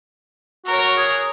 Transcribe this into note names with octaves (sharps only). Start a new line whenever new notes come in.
F#4 A#4 C#5
G#4